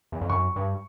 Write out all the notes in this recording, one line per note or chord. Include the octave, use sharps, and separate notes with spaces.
E2
F2
F#2 C#6
G2